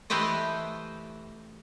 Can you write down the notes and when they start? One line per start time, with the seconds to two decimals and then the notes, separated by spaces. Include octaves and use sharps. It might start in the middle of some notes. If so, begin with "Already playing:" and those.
0.10 E3 A3 G4 B4 C5 D#5